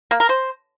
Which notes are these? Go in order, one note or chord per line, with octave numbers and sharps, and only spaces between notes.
A#3
A#4
C5